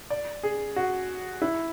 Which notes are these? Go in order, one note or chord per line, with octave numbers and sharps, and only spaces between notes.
D5
G#4
F#4
E4